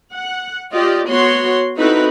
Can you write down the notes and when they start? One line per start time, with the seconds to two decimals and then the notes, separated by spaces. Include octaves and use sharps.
0.12 F#5
0.72 F4 G4 D5 D#5
1.07 B3 F#4 C#5 C6
1.77 C4 D#4 E4 F#4 A4 B4